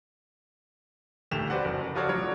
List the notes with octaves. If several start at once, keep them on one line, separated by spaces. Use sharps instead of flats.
D#1 D2 A3 G4 E7 F7
F#4 B4 C5 D5 F#5
F#1
F3 F4 F#4 A4 C#5 D5
F3 F#3 A3 D4 F#4 C#5